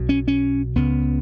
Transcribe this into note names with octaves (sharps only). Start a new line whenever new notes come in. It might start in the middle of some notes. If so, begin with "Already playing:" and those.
Already playing: B1 B2
C#4
C#4
C#2 C#3 B3